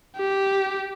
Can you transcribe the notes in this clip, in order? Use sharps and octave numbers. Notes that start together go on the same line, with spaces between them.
G4